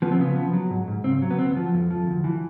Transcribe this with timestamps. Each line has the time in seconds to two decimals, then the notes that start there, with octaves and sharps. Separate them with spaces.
0.02 F3 B3
0.12 C4
0.19 C#3 B3
0.36 F3
0.53 F#3
0.70 G#2
0.88 G#2
1.04 C#3 C4
1.22 F#3
1.31 B3
1.38 D2 C4
1.46 B3
1.56 F3
1.74 F2
1.91 F3
2.07 D2
2.24 E3